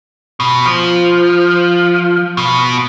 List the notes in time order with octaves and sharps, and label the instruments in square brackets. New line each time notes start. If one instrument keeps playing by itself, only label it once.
[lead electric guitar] B2
F3
B2